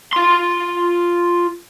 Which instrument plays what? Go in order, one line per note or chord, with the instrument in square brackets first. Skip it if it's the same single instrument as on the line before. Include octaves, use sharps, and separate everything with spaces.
[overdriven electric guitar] F4 C6